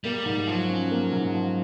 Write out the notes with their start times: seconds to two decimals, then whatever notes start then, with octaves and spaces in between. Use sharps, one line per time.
0.04 G3 A#3
0.26 G#2
0.47 F3 F#3
0.69 C#4
0.91 A#3
1.13 G#2
1.34 F3